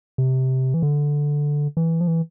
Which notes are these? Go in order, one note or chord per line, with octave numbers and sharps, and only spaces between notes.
C3
E3
D3
E3
F3
E3